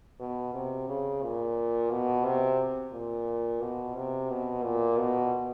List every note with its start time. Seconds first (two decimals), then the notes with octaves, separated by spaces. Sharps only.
0.20 B2
0.54 C3
0.88 C#3
1.23 A#2
1.91 B2
2.25 C3
2.93 A#2
3.61 B2
3.95 C3
4.30 B2
4.63 A#2
4.98 B2